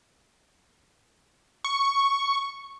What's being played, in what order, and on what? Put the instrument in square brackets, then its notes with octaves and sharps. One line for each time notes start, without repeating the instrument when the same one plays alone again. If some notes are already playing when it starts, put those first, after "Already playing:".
[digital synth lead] C#6